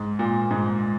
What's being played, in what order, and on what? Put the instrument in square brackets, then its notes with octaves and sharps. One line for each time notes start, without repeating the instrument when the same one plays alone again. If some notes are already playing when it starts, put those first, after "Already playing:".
Already playing: [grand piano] G#2
A#2
G#2